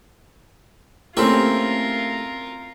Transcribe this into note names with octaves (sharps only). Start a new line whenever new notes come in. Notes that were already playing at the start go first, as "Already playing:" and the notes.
A3 A#3 C4 C#4 E4 F4 G4 A#4